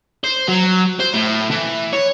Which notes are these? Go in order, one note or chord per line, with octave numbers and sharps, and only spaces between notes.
C5
F#3
C5
A2
E3
C#5